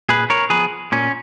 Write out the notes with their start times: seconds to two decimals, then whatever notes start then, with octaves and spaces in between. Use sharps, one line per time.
0.09 A#2 G#4 B4
0.30 A#4 C#5
0.50 F3 B3 G#4 B4
0.92 A#2 C#4